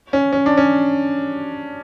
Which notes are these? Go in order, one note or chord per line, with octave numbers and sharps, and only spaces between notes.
C#4
C#4
D4
C#4